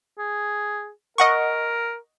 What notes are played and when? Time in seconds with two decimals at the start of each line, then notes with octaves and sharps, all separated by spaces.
0.18 G#4
1.18 A#4 D#5 F#5 C#6